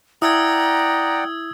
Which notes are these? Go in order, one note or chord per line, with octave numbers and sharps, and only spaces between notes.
E4 D5 F#5 G5 A#5 D#6 E6 G#6